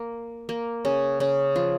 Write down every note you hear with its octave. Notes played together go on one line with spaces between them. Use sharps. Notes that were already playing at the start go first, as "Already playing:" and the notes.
Already playing: A#3
A#3
C#3 C#4
C#3 C#4
F3 F4